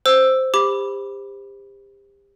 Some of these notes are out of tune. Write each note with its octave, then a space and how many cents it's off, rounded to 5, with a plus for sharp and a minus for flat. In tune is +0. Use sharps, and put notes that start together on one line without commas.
C5 +0 E6 +5
G4 +30 B5 +0 D6 -5